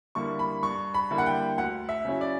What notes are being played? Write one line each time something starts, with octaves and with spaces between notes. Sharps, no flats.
D3 G3 A#3 E4 C#6
B5
G2 C#6
B5
D3 G3 A#3 E4
F#5
G5
D2 F#5
E5
C#3 F#3 C#4 E4
D5